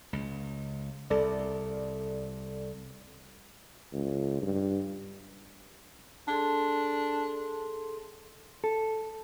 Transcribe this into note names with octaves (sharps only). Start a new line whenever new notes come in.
C#2
C2 A4 D5
C#2
G2
D4 G#4 A4 C6
A4